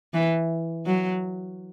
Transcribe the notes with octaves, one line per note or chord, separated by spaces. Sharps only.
E3
F#3